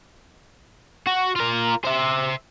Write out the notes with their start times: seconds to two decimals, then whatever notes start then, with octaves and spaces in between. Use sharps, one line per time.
1.07 F#4
1.36 F4 A#4
1.84 C5 E5